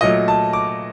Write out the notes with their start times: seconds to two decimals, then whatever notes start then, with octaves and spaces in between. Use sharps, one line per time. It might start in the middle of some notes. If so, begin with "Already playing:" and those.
0.01 A#2 F#3 A3 D#5
0.28 A5
0.53 D6